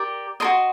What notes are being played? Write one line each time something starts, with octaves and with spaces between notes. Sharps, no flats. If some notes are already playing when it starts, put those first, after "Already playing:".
Already playing: G4 A#4 D5
F#4 A#4 D#5 C6